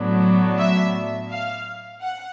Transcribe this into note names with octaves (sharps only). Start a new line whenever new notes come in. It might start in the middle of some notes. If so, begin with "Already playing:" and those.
Already playing: A2 F#3 B3 D4
E5
F5
F#5